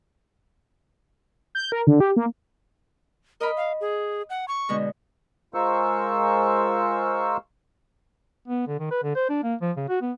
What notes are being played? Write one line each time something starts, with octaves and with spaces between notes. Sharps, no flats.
G6
A#4
D3
G4
A#3
A#4 D#5 B5
F5
G#4
F#5
C#6
B2 D3 G#3
G#3 F4 A#4 C5 C#6 E6
B3
D3
D#3
B4
D3
C5
D4
A#3
F3
C#3
F#4
B3